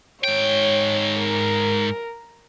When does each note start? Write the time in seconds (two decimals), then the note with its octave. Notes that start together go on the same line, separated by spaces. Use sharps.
0.24 G#2 C#5 G5
1.19 A#4